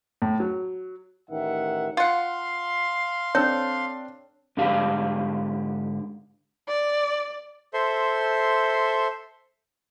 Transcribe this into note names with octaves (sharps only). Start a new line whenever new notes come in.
A2
F#3
A1 D#3 E5 F#5
F4 F5 F#5 C6
C4 D4 A4 C#5 E6
G#2 D3 D4 G4 F5 A5
D5
A4 C5 E5 C6